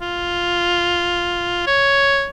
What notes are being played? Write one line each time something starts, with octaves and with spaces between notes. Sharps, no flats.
F4
C#5